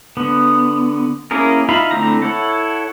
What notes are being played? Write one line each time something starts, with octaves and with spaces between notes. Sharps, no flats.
D3 B3
A#3 C#4 E4 G#4 A#4
D#4 F4 E5 F5 B5
D3 A3 C4 E4 A#5
E4 A4 C#5 F#5